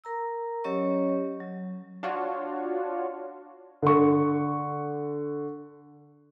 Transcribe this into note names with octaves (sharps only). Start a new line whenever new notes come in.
A#4 A#5 E6
F#3 C#4 G4 C#5 D#5 C#6
F#3
D4 F4 F#4 C#5
D3 C#6